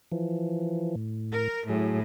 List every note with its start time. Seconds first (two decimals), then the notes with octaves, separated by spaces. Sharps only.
0.12 E3 F3
0.95 A2
1.33 A#4
1.69 A2 F#3 G#4